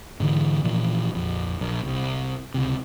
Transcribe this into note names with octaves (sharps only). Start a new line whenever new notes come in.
G#2 D3 E3
A#2 E3 F3
A#1 F2
A#1
C2
C#2 C3